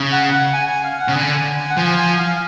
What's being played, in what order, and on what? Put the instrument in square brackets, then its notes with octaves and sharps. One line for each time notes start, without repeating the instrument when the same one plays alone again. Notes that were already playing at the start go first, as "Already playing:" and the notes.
Already playing: [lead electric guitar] C#3
[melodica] F#5
F#5
G#5
G#5
F5
F#5
[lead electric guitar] C#3
[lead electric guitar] D3 [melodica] G#5
[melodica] F#5
[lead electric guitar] F3 [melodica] G#5
[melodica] G#5
F5